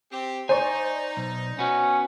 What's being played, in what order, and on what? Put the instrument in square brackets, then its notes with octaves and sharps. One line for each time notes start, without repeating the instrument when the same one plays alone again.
[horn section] C4 G4
[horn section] D#4 [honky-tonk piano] C5 D5 C#6 [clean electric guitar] G#5
[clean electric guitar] B1
[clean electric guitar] B3 F#4 [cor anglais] C#4